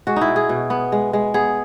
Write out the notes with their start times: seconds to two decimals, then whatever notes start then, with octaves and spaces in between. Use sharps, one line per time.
0.07 G#3 F#4
0.16 D#4 E4
0.28 B2
0.36 G#4
0.49 B2
0.70 B3
0.92 G#3
1.13 G#3
1.34 B3 G#4